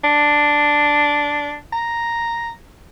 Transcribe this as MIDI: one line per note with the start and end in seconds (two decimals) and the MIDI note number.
0.04 1.56 62
1.72 2.50 82